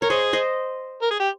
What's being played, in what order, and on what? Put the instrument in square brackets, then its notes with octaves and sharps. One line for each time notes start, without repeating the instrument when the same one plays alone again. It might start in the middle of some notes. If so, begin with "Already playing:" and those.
[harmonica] A#4 [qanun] C#5
[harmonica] G#4 [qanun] C5 D#5
[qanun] C5 D#5
[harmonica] A#4
G#4
G4